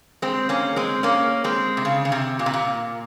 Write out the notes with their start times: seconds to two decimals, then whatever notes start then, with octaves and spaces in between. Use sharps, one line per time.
0.22 G#3 C4
0.49 A#3 C#4
0.76 G#3 C4
1.03 A#3 C#4
1.44 G#3 C4
1.77 C3
1.85 C#3
2.05 C#3
2.12 C3
2.39 A#2
2.46 C3
2.54 A#2